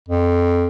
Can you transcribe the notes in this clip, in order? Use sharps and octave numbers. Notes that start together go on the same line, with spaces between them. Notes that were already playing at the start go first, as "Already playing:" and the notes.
F2